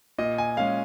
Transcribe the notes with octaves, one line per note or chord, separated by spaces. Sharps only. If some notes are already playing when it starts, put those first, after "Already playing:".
A#2 D#5
G#5
G#3 C#4 F5